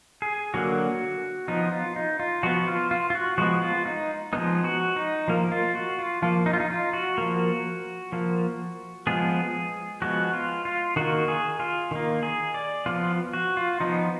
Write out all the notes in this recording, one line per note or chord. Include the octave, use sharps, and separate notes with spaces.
G#4
D3 F#3 A#3 F#4
F3 B3 D#4
F4
D#4
F4
F3 B3 F#4
F4
F4
F4
F#4
F3 G#3 B3 F#4
F4
D#4
F3 G#3 B3 D#4
F#4
D#4
F3 A#3
F4
F#4
F4
F3 A#3 F4
D#4
F4
D#4
F4
F#4
F3 A#3
F3 A#3
F3 G#3 B3 G#4
F3 G#3 B3 F#4
F4
F4
D#3 A#3 F#4
G#4
F4
D#3 A#3
G#4
D5
F3 B3 F4
F#4
F4
F3 B3 D#4